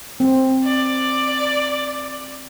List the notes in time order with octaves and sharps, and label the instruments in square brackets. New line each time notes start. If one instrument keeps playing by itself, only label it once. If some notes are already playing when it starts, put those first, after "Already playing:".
[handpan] C4
[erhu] D5